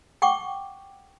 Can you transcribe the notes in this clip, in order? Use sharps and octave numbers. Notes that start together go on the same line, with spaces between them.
F#5 G5 C#6 D6